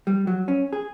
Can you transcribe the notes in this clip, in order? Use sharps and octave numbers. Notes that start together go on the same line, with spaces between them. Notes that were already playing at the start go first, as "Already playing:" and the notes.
G3
F#3
C#4
G#4